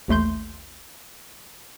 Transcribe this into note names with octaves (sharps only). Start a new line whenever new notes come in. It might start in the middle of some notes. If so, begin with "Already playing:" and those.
A1 D#2 A3 C6 G6